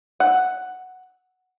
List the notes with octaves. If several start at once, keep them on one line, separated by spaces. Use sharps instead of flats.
F#5